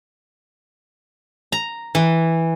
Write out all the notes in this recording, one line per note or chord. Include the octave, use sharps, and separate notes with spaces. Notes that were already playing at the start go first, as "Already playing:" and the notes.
A#5
E3